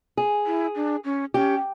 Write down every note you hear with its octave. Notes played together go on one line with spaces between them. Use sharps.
G#4
E4
D4
C#4
C#4 G4